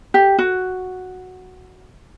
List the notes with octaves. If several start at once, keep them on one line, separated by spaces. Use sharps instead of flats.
G4
F#4